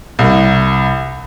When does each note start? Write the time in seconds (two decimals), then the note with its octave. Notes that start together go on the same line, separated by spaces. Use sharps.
0.19 C2